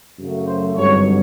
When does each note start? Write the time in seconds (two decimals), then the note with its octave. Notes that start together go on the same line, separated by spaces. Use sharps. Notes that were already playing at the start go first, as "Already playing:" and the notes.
0.19 F#2 C#3 F#3 A3
0.48 C5
0.76 G#1 G2 D3 F#3 C#5